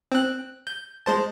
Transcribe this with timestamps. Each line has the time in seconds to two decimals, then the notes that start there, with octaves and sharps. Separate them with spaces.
0.12 C4 F#6
0.67 G6
1.06 G#3 C5 A5